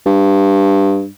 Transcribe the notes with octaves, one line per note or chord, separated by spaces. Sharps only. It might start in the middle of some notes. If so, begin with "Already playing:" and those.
G2